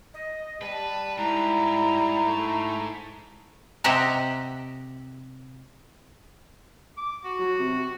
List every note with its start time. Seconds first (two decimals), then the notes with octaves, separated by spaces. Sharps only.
0.14 D#5
0.61 G3 B4 A5
1.18 G#2 E4 A#5
2.26 A3
3.84 C3 G4 D#5 E5 F#5 A#5
6.97 D6
7.25 F#4
7.39 F#3
7.59 C3